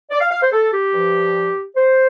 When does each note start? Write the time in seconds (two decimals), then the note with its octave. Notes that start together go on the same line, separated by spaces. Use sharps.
0.10 D5
0.20 F5
0.31 F5
0.41 C5
0.52 A4
0.72 G4
0.93 G2 F3
1.76 C5